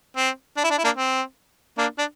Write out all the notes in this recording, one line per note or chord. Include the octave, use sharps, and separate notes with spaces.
C4
D4
E4
D4
E4
A#3 D4
C4
A#3 D4
D4